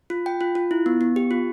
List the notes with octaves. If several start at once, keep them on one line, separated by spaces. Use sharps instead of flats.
F4
G5
F4
F4
E4
B3
B3
G4
F4